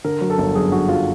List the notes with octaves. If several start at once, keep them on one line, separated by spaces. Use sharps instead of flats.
D3 A#4
F#3
A4
G1
F#2 G#4
D3 F#4
F#3 F4